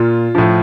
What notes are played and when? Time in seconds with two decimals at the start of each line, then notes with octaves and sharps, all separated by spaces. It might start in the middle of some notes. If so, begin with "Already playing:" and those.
Already playing: A#2 F4
0.35 A2 F3